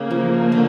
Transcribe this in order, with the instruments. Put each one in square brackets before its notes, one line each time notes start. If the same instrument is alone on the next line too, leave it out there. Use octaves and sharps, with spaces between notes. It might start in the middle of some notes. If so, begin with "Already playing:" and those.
Already playing: [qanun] C#3 A3 [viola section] A#3
[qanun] F3
D3